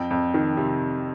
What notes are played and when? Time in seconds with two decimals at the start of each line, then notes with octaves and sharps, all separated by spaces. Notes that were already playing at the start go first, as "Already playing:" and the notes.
Already playing: F2 G5
0.11 F2
0.34 D#3
0.57 C3